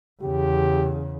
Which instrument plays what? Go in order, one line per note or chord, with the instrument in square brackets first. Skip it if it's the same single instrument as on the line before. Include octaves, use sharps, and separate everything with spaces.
[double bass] E2 C#3 [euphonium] G4